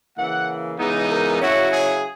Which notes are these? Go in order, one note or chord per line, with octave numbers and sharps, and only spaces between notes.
C#3 E3 A#3 F#5
C#3 E3 G#3 B3 D#4
A#4
C#3 F#3 C#4 E4 F#4
G#4